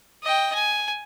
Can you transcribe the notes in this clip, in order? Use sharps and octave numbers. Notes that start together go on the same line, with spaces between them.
D#5 G5
G#5